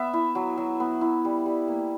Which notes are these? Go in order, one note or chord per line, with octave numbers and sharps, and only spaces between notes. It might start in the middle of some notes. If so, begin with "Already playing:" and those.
Already playing: B3 E5
E4
F#3
F#3
B3
E4
G3
G3
A#3